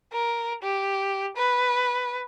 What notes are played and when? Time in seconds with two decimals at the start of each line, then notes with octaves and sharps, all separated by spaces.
0.13 A#4
0.62 G4
1.36 B4